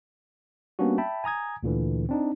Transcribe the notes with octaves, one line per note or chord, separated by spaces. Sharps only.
G3 A#3 B3 C#4 D4 F#4
E5 G5 A5 B5
G#5 A#5 D#6 G#6
D2 A#2 D3 E3
C4 D4 D#4